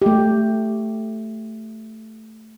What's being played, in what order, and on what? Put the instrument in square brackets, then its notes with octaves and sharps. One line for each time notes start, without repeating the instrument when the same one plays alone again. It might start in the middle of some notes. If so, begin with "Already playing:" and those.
[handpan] A3 G4